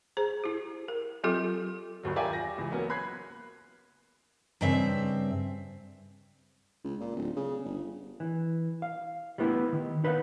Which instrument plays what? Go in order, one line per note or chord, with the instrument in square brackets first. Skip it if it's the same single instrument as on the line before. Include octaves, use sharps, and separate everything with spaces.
[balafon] G#4 C5 A#5
E4 G4
A#4
F#3 C4 F4 G4 A4 D6
[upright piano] G1 D#2 F#3
F4 G4 A#4 D5 E5 G#5
A#6
C#2 E3
F#3 A#3 B3 C#4
B5 F#6 G#6 C7
[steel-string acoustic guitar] G2 C#3 C4 E5
[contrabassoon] C#2
A#2
D1
C#3
G1
[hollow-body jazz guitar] E3
F5
G3 A3 B3 E4 G4
D#3
D#4 B4 C5 D#5 F5 F#5